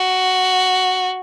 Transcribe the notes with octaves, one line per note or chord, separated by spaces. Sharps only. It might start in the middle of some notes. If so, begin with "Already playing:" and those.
Already playing: F#4